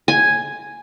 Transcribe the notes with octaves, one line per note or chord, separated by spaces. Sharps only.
G#5